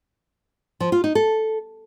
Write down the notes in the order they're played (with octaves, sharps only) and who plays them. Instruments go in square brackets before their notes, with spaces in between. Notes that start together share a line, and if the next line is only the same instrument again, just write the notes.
[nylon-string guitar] F3
F4
D#4
A4